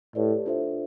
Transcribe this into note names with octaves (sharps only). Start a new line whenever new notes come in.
A2 G4 B4 D5
D4 F4 A4 C5 E5